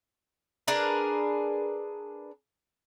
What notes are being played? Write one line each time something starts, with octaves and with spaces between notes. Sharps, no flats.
D4 G#4 A#4 B4